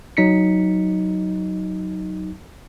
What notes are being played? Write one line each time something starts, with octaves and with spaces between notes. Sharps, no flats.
F#3 D#4 B6 C#7